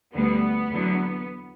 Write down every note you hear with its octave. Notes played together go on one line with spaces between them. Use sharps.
D2 D3 G3 B3
E2 D3 F#3